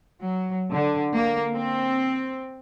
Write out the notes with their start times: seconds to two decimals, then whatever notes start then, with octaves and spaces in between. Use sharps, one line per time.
0.23 F#3
0.73 D3
1.14 A#3
1.54 C4